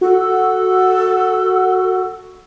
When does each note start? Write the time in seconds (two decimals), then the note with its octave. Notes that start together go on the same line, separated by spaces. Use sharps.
0.01 F#4 A4